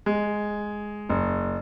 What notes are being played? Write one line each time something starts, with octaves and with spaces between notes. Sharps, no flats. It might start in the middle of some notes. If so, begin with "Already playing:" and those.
G#3
F#1